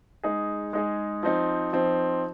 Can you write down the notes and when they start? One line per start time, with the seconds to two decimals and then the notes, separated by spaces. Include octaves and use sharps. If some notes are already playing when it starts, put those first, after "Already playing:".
0.23 G#3 D#4 G#4
0.73 G#3 D#4 G#4
1.23 F3 C4 D#4
1.73 F3 C4 D#4